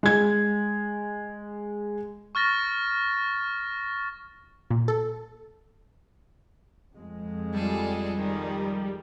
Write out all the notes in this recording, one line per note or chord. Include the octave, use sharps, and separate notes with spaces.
G#3 G#6
C#6 F6 A6 A#6
A#2
A4
F2 G#3
G3 F4 G#4 A4
D#3 F3